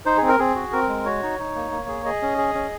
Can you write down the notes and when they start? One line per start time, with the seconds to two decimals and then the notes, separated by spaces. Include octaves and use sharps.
0.06 D#4 C5
0.18 C4 G#4
0.28 A#4
0.39 C4 G#4
0.55 F#4
0.73 C4 A#4
0.89 G#3
1.05 F#4 C#5
1.23 D#4
1.39 D#4
1.55 A#3
1.72 A#3
1.88 G#4
2.05 G#4 D#5
2.22 C#4
2.38 G#4
2.55 C#4